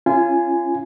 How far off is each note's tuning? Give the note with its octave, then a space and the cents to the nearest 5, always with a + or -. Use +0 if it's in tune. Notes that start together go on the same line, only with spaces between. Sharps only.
C#4 +0 F4 -30 G#5 +0